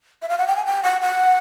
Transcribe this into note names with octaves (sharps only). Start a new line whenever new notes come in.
E5
F5
F#5
G5
G#5
G5
F#5
F#5